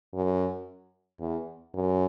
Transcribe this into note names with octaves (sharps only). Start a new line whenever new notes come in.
F#2
E2
F#2